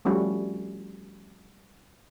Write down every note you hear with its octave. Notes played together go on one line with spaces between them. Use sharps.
F3 G3 A3 C#4 F#4